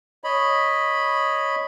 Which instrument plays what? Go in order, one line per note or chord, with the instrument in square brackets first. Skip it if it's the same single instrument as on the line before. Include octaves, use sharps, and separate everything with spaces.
[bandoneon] C#5 D#5 B5